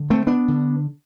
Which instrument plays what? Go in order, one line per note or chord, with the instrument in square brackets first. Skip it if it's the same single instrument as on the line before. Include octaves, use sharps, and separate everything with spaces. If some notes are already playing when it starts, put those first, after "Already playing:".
Already playing: [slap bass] D3
A3 C4
B3 D4
D3